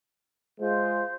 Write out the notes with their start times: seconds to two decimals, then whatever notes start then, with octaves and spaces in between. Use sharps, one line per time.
0.59 G#3 F4 C5